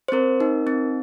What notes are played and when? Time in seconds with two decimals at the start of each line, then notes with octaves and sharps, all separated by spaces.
0.08 C5
0.12 C4 A#4
0.40 D#4
0.67 C4